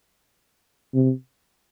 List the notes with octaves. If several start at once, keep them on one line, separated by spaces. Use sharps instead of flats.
C3